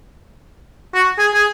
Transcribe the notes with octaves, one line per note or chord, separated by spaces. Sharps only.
F#4
G#4
G#4